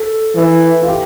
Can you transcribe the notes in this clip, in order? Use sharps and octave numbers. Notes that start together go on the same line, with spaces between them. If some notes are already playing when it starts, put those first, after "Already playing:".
Already playing: A4
E3
F4
G4